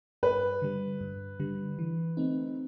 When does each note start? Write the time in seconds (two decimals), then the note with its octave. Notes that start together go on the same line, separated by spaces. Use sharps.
0.23 G2 B4
0.62 D3 G3
1.01 G2
1.40 D3 G3
1.79 E3
2.17 A3 C4 D#4